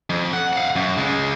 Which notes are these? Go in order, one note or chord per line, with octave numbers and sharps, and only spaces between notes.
F2
F#5
F5 F#5
F#2
C#3 G#3